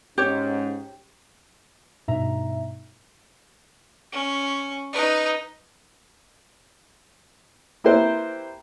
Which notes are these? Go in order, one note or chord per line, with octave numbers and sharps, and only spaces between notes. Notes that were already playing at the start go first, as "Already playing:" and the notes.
G#2 C#4 G4 C#5
G2 B2 D#4 E5 A#5
C#4
D#4 B4
A#3 E4 G4 B4 C5